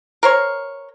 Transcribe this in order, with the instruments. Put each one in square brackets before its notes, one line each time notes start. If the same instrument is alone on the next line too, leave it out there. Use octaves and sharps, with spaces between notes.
[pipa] A#4 C5 C#5